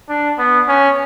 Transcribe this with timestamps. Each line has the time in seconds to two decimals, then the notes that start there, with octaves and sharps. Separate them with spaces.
0.09 D4
0.39 B3
0.68 C#4